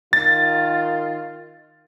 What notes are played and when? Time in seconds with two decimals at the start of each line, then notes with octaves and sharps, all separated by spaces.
0.13 D#3 F4 A6